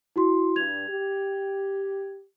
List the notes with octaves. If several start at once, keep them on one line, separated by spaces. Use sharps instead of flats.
E4 F#4 C6
G2 G#6 F7
G4